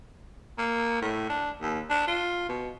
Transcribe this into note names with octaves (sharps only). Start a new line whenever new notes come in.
A#3
A2
D4
D#2
D4
F4
B2